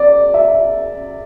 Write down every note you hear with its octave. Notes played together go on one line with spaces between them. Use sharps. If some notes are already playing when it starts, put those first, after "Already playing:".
Already playing: D5
E5